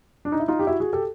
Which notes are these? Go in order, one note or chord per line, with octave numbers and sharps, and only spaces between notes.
D4
D#4
E4
D#4 F4
G4
E4 F#4
F#4 G#4
G4 A4